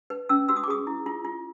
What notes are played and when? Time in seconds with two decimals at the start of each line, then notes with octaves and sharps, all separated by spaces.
0.10 B4
0.29 C#4 E6
0.49 F#4 E6
0.56 D#6
0.64 D6
0.68 G#4 D#6
0.87 E4
1.06 F4
1.25 F4